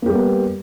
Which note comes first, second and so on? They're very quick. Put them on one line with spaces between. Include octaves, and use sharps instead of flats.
A#3 G4 G3 B3